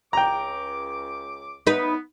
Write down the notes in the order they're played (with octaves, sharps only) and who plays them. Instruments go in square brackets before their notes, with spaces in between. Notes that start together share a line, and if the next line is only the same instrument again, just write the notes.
[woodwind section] C#2 D6 [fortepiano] G5 A#5
[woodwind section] B3 [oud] D#4 B4